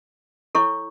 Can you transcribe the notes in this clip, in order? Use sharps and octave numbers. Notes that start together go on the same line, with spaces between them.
E4 A4 C#5 C#6